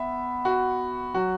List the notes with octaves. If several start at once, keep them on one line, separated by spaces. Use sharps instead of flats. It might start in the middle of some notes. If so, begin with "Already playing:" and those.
Already playing: B3 E5
F#4
F#3 F#4